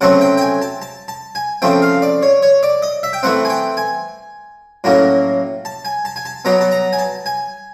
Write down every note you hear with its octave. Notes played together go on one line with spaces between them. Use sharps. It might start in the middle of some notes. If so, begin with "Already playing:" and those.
C#3 F#3 A3 C4 F#5
G5
G5
G#5
A5
A5
A5
G#5
C#3 F3 A3 C4 G5
F5
D5
C#5
C#5
D5
D#5
E5
G5
E3 A3 C4 F#5
G#5
G5
G#5
A2 F#3 A#3 C#4
A5
G#5
A5
G#5
A5
B2 F#3 B3 A#5
A5
A#5
G#5
A5
G#5